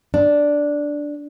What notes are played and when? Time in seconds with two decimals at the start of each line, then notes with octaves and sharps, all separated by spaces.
0.14 D4